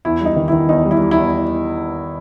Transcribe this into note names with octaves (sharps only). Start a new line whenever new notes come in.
E2 E4
G3 D#4
D#3
D#3 E4
E2 D#4
G3
E4
G3
E4
E2